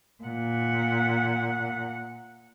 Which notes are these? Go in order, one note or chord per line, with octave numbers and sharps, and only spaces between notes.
A#2 F#5